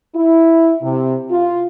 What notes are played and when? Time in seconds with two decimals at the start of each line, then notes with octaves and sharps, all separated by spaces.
0.16 E4
0.83 C3
1.31 F4